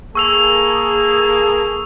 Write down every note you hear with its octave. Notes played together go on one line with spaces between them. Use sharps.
A#3 G#4 A4 C#6 E6 F7